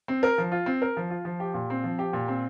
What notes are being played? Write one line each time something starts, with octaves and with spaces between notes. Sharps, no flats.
C4
A#4
F3
F4
C4
A#4
F3
F4
F3
G4
A#2
C4
F3
G4
A#2
C4